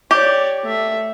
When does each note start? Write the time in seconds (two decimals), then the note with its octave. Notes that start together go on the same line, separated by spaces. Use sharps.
0.11 G4 C#5 D5
0.63 A3 E5